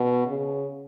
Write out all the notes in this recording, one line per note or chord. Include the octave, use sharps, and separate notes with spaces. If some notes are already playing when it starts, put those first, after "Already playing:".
Already playing: B2
C#3